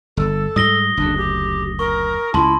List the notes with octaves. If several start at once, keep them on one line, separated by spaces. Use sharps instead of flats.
G1 A4
G#2 G3 D#6 A#6 G7
F#1 D2 D4
G4
A#4 C#6
C#2 E4 A5 C6